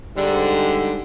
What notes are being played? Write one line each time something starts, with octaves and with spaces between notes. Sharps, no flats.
G#2 D3 G3